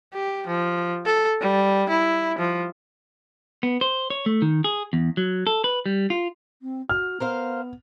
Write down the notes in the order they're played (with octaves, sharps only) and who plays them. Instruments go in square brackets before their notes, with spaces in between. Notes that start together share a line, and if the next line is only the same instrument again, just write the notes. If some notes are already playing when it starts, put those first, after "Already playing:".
[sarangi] G4
F3
A4
G3
E4
F3
[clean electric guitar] B3
C5
C#5
A3
D#3
G#4
E2
F#3
A4
B4
G3
F4
[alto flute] C4
[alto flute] F#4 [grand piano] F6
[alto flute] B3 [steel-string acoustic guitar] A#4 C5 F5